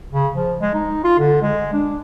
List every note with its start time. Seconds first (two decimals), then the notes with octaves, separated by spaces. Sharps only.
0.12 C#3
0.36 F3
0.61 G#3
0.75 D#4
1.04 F4
1.19 D3
1.42 G#3
1.73 D4